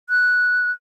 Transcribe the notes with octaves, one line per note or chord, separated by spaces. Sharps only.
F#6